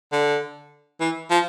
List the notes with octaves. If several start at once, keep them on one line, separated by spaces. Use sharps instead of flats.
D3
E3
F3